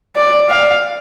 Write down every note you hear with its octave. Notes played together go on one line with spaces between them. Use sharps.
D5
F5